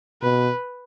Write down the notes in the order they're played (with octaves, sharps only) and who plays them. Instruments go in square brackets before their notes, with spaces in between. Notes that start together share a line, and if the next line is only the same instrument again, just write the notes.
[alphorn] B2 [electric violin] B4